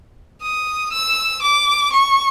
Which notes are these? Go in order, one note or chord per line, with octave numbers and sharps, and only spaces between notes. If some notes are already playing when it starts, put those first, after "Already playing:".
D#6
E6
D6
C#6